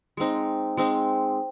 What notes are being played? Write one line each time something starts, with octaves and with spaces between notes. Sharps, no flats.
G#3 C4 D#4
G#3 C4 D#4